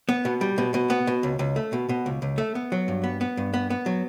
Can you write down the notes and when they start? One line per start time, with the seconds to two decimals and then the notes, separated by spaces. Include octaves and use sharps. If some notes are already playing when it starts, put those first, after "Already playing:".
0.09 B3
0.25 B2
0.41 G3
0.58 B2
0.74 B2
0.90 B3
1.07 B2
1.23 C#2
1.39 C#2
1.56 A3
1.73 B2
1.89 B2
2.06 C#2
2.22 C#2
2.38 A3
2.55 B3
2.72 F#3
2.88 G2
3.04 B3
3.21 B3
3.37 G2
3.54 B3
3.70 B3
3.86 F#3